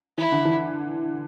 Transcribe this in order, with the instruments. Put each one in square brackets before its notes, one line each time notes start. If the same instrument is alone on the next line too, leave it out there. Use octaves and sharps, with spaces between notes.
[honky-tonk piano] E3 [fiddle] E4
[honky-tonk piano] D3
E3